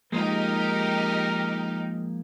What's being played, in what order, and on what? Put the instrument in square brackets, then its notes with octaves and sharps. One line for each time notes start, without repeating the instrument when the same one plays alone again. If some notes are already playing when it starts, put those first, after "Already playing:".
[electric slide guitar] F3 G#3 A#3 [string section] D#4 G4 [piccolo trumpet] A#4